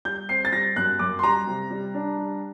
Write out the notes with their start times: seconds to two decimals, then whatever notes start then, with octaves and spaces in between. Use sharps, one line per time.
0.05 G3 G6
0.29 C4 C7
0.45 A6
0.53 G3 A#6
0.76 F#2 F#6
0.99 F#2 D6
1.19 C6
1.23 G3 A#5
1.47 C3
1.71 G3
1.94 D4
2.18 G3